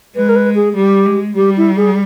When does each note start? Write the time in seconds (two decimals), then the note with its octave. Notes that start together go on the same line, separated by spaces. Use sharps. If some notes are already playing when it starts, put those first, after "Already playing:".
0.16 G#3 B4
0.29 A#4
0.36 B4
0.55 G#4
0.76 G3 G4
1.06 G#3
1.36 G3 G4
1.57 E4
1.76 G#4